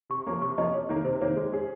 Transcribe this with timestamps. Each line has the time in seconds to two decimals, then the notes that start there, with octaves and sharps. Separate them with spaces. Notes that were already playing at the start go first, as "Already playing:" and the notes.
0.10 C3 C#6
0.27 F3 A#3 C#4
0.41 C3 C#6
0.58 F3 A#3 C#4 D#5
0.74 C3 C#5
0.89 D#3 A#3
1.05 C3 C5
1.21 D#3 A#3 C#5
1.36 G#3
1.52 C#4 G#4